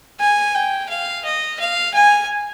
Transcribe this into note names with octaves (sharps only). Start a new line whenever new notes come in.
G#5
G5
F5
D#5
F5
G#5